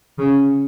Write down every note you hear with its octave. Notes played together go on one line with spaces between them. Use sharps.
C#3